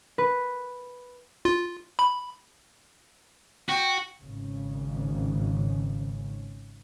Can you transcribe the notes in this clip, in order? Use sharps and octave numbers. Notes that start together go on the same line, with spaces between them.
B4
F4
B5
F#4 G5
G#1 C#3